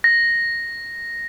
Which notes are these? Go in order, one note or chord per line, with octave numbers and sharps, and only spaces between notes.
A#6